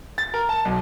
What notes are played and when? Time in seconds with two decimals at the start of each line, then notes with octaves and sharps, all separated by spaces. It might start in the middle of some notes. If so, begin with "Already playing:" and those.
0.18 A6
0.34 A#4
0.49 A5
0.65 B1